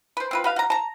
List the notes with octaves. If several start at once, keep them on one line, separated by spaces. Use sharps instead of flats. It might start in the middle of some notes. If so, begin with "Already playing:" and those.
B4 C5
C4 F4 B4
F#4 B4 F5
F#4 A#5
A5 A#5